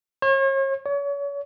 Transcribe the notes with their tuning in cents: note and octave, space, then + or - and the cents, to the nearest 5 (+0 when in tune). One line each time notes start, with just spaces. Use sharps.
C#5 -40
C#5 +35